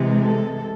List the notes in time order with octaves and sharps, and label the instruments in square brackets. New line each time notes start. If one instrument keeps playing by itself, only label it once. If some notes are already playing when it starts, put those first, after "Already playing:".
Already playing: [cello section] C3 E3 G#3
A4